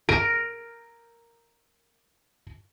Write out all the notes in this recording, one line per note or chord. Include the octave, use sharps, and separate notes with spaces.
A#4 D7